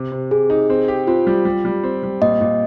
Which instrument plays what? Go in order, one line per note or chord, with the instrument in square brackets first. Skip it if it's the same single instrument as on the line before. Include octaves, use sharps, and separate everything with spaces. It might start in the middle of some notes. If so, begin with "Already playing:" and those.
Already playing: [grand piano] C3
C3
[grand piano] C3 [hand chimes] G#4
[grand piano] D#4
C4
G4
[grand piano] C4 [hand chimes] F4
[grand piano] G3
G3
G3
C4
G3
[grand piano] A#2 [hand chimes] D#5
[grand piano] A#2